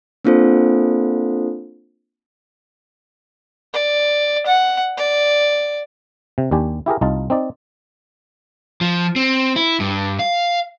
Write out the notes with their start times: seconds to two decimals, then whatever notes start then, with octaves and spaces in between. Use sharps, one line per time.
0.25 A#3 C4 D4 F4 A4 C5
3.74 D5
4.46 F#5
4.97 D5
6.38 C3
6.51 D#2 D4 G4 G#5
6.86 E4 G4 G#4 A#4
7.01 C2 D#4 F4 A5
7.30 C4 D#4 D5
8.81 F3
9.16 C4
9.56 E4
9.80 G2
10.19 F5